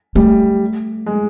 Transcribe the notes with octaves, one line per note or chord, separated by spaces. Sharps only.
G3 A3
G#3